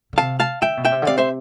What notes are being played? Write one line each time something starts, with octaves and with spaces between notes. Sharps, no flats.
D3
C3 F5 A5
F5 A5
D3 E5 G5
B2
E5 G5
C3
D3
C3 D5 F5
C5 E5